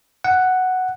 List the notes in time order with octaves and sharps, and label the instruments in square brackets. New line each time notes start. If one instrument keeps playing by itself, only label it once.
[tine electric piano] F#5